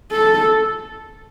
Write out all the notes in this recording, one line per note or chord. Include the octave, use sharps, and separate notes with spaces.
A4